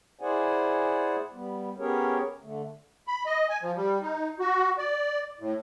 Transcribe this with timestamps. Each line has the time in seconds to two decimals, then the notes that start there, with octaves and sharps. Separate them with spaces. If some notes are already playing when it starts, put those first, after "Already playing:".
0.21 E4 G#4 C5 D5 F#5 G#5
1.32 G3 B3
1.78 B3 C#4 G4 G#4 A#4 C#5
2.42 D3 A3
3.08 B5
3.26 D#5
3.49 G#5
3.62 F3
3.76 G3
4.02 D#4
4.40 F#4
4.78 D5
5.40 A2